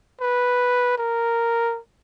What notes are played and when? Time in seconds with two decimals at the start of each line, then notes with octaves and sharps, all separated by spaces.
0.21 B4
0.98 A#4